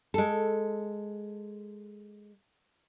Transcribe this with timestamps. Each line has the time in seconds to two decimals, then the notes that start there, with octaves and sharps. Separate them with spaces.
0.14 G#3 A4